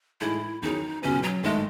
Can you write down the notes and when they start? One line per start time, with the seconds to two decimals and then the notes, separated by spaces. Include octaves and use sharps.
0.21 A2 E3 G#3 D#4 E4 A4
0.62 E2 D#3 F#3 C#4 D#4 G#4
1.02 C#2 B2 F#3 B3 C#4
1.23 F#3
1.43 G#1 G#2 D#3 G#3 A3